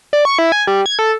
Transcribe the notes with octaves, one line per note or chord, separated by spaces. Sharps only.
D5
C#6
E4
G#5
G3
G#6
A4